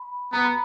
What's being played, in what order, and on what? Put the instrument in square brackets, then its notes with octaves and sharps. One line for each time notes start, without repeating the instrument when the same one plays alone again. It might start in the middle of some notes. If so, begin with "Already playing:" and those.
Already playing: [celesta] B5
[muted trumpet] B3 [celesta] A#5
[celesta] B5